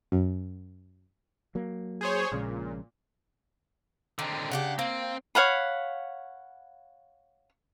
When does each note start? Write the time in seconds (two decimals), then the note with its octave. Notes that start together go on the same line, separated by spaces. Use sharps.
0.12 F#2
1.55 F#3 A#3
2.01 G#4 C5 C#5
2.32 A#1 A#2 C#3 G#3
4.19 D3 D#3 C4
4.52 C#3 D4 G4 F#5
4.79 A#3 C4
5.35 C#5 F5 F#5 B5